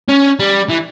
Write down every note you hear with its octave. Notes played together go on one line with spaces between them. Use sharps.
C#4
G3
E3